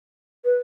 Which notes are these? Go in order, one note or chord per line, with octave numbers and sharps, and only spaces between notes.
B4